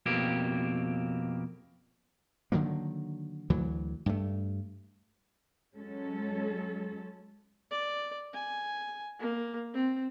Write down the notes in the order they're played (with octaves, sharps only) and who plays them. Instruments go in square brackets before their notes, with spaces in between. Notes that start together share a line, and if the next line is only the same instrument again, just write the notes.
[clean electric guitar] F2 B2 A#3 C4 G4
[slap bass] D3 D#3 F#3 A#3
D2 E3 F#3
G2 A3
[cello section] F#3 G#3 C#4 A4
[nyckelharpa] D5
G#5
A#3
C4